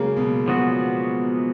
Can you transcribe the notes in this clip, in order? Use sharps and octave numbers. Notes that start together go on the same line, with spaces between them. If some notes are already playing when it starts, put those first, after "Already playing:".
Already playing: C#3 F#3 G#3 A#3
B2
F3 G#3 B3 F#4